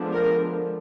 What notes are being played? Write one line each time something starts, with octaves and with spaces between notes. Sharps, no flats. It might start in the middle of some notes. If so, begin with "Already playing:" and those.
Already playing: D3 F3 G#3 B3 D4
A#4